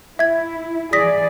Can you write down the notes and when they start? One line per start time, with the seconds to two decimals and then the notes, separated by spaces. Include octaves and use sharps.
0.19 E4 E5 G#6
0.93 E3 G#4 D5 D#6 A#6 B6